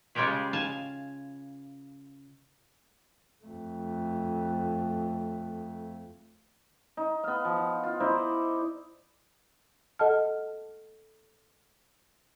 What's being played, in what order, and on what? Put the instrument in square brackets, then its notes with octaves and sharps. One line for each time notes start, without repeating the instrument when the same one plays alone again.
[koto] C#3 G3 G#3 F4 G4 G#4
F5 G#5 A5
[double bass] F2 A3
[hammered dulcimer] D#4
B3 F5
F3
F#5
F4
D#4 E4 C5 D5
[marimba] A4 D#5 F#5 A5 F6